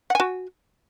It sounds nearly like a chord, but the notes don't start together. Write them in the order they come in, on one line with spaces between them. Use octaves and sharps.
F#5 G#5 F#4